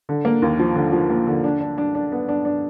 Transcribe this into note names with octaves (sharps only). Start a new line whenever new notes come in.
D3
A#3
D#2
F3
D3
F3
A#3
D3
D4
D4
D4
D4
B3
D4
D4